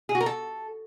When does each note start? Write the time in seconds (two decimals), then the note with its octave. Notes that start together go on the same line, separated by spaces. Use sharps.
0.09 G#4
0.15 F#4
0.20 A#4
0.26 A4